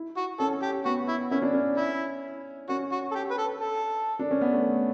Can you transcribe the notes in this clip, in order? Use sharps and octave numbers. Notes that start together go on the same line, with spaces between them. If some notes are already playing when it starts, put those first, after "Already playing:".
Already playing: E4
F#4
C#4 A4
G4
B3 F#4
E4
C#4 E4
D4
C#4
E4
C#4 F#4
F#4
A4
G4
B4
A4
A4
D4
C#4
B3
A3